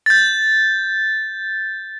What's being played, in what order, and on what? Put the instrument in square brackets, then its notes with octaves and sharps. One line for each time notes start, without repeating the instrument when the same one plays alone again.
[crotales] G6 A6